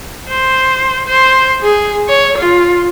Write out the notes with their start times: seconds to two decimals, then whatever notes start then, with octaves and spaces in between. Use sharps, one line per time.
0.29 C5
1.08 C5
1.62 G#4
2.09 C#5
2.38 F4